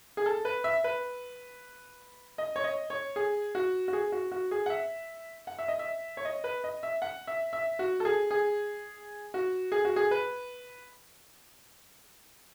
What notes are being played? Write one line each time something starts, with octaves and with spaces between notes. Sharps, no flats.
G#4
A4
B4
E5
B4
D#5
C#5
D#5
C#5
G#4
F#4
F#4
G#4
F#4
F#4
G#4
F#5
E5
F#5
E5
D#5
E5
C#5
D#5
B4
D#5
E5
F#5
E5
E5
F#4
A4
G#4
G#4
F#4
G#4
F#4
G#4
B4